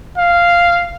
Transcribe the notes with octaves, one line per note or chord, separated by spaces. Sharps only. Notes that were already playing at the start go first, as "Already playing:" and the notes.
F5